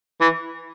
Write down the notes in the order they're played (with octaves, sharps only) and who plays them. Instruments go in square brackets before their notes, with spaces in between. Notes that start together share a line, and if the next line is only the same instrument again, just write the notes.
[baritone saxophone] E3